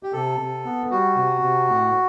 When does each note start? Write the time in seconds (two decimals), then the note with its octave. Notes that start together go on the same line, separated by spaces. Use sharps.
0.03 G4
0.13 C3 A4
0.39 C3
0.64 B3
0.91 G3 F#4
1.15 C3
1.42 C3
1.67 A2